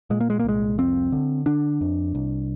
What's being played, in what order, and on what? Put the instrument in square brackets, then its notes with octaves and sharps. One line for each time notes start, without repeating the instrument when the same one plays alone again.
[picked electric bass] A#2 G#3
A#3
G#3
A#3
C2 G#3
F2 C4
D3
D3 D4
F2
C2